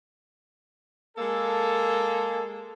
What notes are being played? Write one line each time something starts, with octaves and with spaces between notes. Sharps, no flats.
G#3 A#3 A4